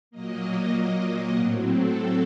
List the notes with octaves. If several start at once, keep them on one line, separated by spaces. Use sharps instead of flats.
A#2 F#3 A#3 D#5
A2 F#3 C4 A#4
A4